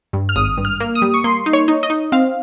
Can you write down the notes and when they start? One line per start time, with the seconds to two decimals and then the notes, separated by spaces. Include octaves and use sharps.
0.13 G2
0.29 F6
0.36 G#1 D#6
0.57 G2
0.65 F6
0.80 A#3
0.95 D#6
1.02 G3
1.14 C#6
1.24 A#3 C6
1.46 D#4
1.53 C#5
1.68 D#4
1.83 D#5
1.90 D#4
2.12 C4 F5